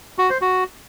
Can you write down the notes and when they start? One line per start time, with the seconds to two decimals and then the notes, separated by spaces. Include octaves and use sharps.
0.19 F#4
0.30 C5
0.42 F#4